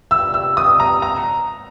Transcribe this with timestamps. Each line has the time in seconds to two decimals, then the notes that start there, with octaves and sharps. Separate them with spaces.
0.11 E6
0.34 E6
0.57 D#6
0.80 A#5
1.02 A#5